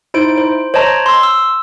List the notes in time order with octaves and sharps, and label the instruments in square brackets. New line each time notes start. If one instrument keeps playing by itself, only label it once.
[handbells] D#4 E4 C5 D7
C5
C5 C#5 D#5 A5 A#5
C6 E6
E6